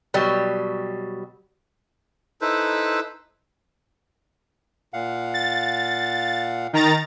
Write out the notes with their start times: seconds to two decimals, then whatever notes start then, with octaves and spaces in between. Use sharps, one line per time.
0.14 B2 F#3 G3
2.42 D#4 E4 A4 B4 C5
4.94 A#2 F5 F#5
5.34 A6
6.73 D#3 A#5 A6